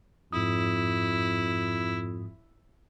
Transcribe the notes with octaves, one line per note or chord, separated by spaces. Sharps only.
F2 G#2 E4 D#6